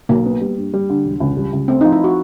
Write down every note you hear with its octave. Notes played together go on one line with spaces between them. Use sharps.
B1 A#3
B3
G3
G2
G3
D3
E1
C#2
G3
C#2
A3 C4
F3 D#4
E4
F#4